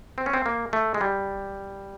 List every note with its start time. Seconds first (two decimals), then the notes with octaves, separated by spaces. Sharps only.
0.18 C4
0.26 C#4
0.33 C4
0.46 A#3
0.73 A3
0.94 G#3
1.01 G3